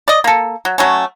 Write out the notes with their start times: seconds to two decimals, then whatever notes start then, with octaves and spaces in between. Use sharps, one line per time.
0.08 D5 D#5
0.24 A#3 A4
0.65 F#3
0.78 F#3 A3 C#4